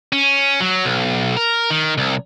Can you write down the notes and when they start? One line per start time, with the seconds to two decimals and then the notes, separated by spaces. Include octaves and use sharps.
0.13 C#4
0.60 F#3
0.85 B1
1.37 A#4
1.70 D#3
1.98 C2